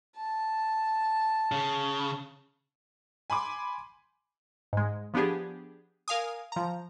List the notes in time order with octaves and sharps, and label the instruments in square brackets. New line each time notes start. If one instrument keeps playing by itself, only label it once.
[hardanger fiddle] A5
[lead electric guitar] C#3
[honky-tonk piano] G#5 B5 C6 D6
[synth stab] G#2 G#3
F3 B3 D4 G4 G#4
A#4 F5 G#5 D#6
F3 A#5